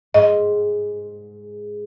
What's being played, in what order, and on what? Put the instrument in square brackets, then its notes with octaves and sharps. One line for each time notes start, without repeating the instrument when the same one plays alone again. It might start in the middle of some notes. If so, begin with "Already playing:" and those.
[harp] G#2 [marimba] D#5